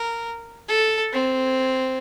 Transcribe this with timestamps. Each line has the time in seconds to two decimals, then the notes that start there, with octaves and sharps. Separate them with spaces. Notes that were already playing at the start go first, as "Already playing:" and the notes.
Already playing: A#4
0.68 A4
1.13 C4